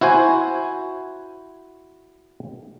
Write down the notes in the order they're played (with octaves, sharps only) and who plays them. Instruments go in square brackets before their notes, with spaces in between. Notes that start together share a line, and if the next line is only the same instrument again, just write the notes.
[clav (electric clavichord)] E4 F#4 C5 G#5